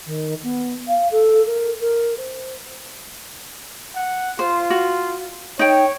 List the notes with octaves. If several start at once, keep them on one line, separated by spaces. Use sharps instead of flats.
D#3
B3
F5
A4
A#4
A#4
C5
F#5
F4 C5
F#4
D#4 C#5 G5